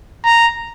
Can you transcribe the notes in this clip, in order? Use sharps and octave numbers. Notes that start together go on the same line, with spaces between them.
A#5